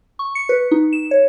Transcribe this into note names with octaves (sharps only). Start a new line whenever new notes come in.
C#6
C#7
B4
D#4
E7
C#5